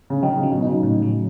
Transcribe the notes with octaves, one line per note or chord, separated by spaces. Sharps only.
C#3
D#3 F#3
C#3
F#3
B2
C#3 D#4
A2
F#3